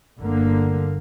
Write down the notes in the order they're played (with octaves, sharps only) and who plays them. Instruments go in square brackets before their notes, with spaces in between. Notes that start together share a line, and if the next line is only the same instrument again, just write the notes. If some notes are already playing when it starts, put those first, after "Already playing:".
[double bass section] G1 D3 A#3